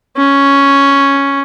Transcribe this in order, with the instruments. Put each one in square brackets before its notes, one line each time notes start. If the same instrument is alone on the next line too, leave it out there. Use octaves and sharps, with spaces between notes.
[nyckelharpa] C#4